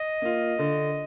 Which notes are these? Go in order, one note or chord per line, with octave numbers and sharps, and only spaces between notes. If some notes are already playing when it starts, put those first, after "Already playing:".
Already playing: D#5
A#3 F4
D3